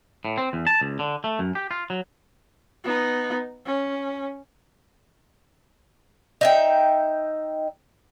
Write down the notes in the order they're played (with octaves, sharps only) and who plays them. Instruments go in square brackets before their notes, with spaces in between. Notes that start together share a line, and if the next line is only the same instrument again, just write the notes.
[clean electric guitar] A2
C4
E2
A5
C#2
D3
A3
F#2
G4
F4
F#3
[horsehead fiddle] B3 D#4
C#4
[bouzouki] D#4 E5 G5